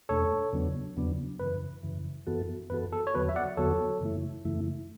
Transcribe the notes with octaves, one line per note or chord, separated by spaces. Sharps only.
E2 B2 A3 D4 A4 C#5
E2 C#3 F#3 B3 D4
E2 C#3 F#3 B3 D4
F#2 C#3 E3 B4
F#2 C#3 E3
F#2 E3 B3 F#4 A4
F#2 E3 B3 F#4 A4 B4
A4
C#5
E2 D3 F#3 B3 F#4 B4
E5
D5 F#5
E2 D3 F#3 B3 F#4 A4 C#5
F#2 C#3 E3 A3 E4
F#2 C#3 E3 A3 E4